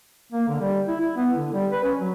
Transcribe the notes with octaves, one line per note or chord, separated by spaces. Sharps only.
A#3
D3
G3
E4
E4
B3
D3
G3
B4
C#4
F#3